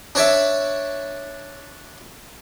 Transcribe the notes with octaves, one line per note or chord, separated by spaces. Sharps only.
D4 C#5 D5 E5